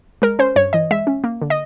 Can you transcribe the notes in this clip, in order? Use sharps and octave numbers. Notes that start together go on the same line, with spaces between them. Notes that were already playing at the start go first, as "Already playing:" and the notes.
G#3 A#4
C#4 C5
G2 C#5
E3 D#5
G#3 E5
C#4
A#3
D3
D#5